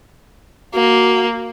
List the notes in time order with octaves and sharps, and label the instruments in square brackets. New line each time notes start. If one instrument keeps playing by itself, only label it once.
[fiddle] A#3 [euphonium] F#4